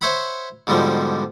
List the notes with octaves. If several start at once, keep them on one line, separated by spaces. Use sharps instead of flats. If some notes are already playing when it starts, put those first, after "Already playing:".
C5 C#5 E5 F#5 B5
G#2 B2 D3 F3 G3